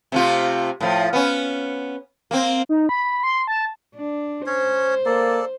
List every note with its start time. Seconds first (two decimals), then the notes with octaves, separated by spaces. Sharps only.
0.12 C3 A3 F4
0.80 A2 F3
1.13 B3 C#4
2.31 A#3 C4
2.69 D#4
2.89 B5
3.23 C6
3.48 A5
3.95 D4
4.47 C#4 C5 C#5
5.06 A#3 A4 D5